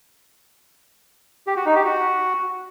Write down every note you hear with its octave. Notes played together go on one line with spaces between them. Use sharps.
G4
F#4
D#4
G4
F#4